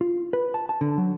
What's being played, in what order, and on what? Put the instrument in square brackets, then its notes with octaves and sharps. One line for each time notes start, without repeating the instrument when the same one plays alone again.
[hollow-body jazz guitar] F4
B4
A5
A5
D3
F#3